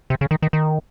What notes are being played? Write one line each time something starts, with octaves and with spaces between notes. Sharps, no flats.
C3
C#3
D#3
D#3
D#3